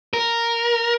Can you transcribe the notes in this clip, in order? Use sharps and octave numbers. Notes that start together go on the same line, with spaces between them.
A#4